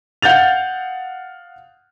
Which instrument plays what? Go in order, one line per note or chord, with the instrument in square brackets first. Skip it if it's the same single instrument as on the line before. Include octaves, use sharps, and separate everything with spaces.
[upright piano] F5 F#5 G6 A6 F7